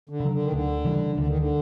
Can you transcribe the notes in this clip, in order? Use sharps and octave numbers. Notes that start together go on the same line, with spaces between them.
D3
C#3 F#3
D3
D#3
D2 D3
C#3 E3 G3
D2 D3
D#3
D3